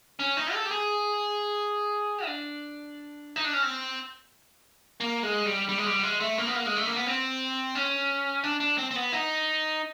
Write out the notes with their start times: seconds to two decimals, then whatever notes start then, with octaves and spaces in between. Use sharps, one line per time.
0.19 C#4
0.37 D#4
0.54 A4
0.66 G4
0.71 G#4
2.25 D4
3.36 D#4
3.45 D4
3.53 C#4
3.63 C4
5.00 A#3
5.23 G#3
5.46 G3
5.69 G3
5.78 G#3
5.86 G3
6.03 G#3
6.20 A3
6.38 A#3
6.47 B3
6.56 A#3
6.66 G#3
6.76 A3
6.86 A#3
6.96 B3
7.06 C4
7.75 C#4
8.44 D4
8.60 D4
8.78 C4
8.91 C4
8.96 B3
9.13 D#4